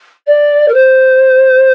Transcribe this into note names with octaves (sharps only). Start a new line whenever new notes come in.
D5
A#4
C5